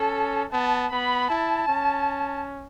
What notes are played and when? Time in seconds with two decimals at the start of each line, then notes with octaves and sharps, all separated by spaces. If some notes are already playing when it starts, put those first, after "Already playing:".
Already playing: C#4 A4
0.53 B3 A5
0.92 B3 B5
1.30 E4 A5
1.68 C#4